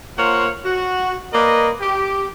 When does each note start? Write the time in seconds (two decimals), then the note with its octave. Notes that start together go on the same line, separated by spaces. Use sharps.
0.18 A#3 F4 A#4 C5 C#5 F#5
0.65 F#4
1.33 A#3 A#4 B4 D5 D#5
1.81 G4